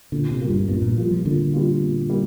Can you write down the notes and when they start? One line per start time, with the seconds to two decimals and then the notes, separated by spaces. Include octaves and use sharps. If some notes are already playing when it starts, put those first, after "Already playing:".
0.12 A#2 D3
0.31 C3
0.40 G3 A#3 F4
0.50 G2
0.69 G2 A#2
0.82 A#2
0.97 F3 G3 A#3 F4
1.11 F3
1.25 A#2 D3
1.53 G3 A#3 F4
1.82 A#2
2.10 G3 A#3